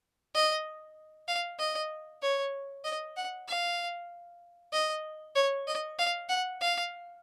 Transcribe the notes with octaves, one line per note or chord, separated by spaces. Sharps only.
D#5
F5
D#5
C#5
D#5
F#5
F5
D#5
C#5
D#5
F5
F#5
F5